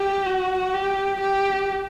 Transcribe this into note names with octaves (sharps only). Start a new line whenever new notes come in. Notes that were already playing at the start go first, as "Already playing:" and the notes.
Already playing: G4
F#4
G4
G4